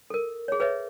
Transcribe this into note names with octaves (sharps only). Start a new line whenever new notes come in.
A4 A#4
G#4 C#5
G#4 B4 C#5 D#5 E5